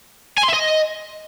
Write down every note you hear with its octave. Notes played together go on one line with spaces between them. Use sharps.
G#5
C6
E5
D#5